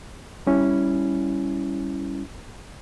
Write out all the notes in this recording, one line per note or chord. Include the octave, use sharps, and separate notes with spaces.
G3 C#4 E4